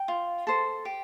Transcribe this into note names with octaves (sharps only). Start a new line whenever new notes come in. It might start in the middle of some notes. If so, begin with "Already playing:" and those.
Already playing: G5
F4
A4 C5
G4